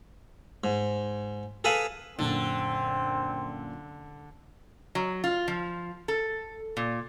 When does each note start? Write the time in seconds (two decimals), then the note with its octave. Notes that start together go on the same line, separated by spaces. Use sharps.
0.64 G#2
1.64 G#4 A4 B4 F5 G#5 B5
2.19 F#2 A#2 D3 C4
4.95 F#3
5.24 F4
5.48 F3
6.08 A4
6.77 A#2